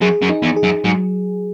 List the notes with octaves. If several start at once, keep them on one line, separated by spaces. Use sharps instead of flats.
F#2 G#4
F#2
D#4
E2
G#4
F#2
G#2 F#3